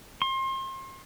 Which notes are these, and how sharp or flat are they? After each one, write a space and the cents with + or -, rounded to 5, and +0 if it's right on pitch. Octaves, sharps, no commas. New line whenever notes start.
C6 +35